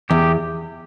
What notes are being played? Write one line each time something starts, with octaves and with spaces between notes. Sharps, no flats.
E2 G4